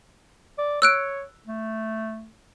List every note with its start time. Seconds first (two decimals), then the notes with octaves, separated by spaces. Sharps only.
0.58 D5
0.82 C#5 E6 F#6 D7
1.48 A3